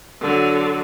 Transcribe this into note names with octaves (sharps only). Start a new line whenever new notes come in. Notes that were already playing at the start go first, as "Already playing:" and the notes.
D3 F#3